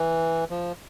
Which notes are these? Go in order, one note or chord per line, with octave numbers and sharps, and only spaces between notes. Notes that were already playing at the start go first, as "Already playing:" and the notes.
Already playing: E3
F3